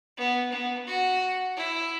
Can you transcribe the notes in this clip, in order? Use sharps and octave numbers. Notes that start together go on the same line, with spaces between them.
B3
B3
F#4
E4